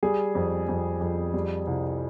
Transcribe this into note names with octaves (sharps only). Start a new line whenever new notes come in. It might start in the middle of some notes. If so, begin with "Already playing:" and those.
G3 G#4
F2
F2
F2
G3
C2